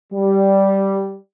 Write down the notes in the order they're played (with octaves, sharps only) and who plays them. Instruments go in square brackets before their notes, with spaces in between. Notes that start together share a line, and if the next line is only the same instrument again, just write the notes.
[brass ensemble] G3